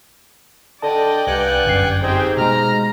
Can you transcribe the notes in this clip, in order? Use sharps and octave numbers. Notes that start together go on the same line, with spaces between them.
D3 D5 D#5 G5 A5
C2 G2 F#5 G#5 F#6
G1 F#2 C7
G#2 C4 G4 G#4 G5
B2 G#3 A#5 F6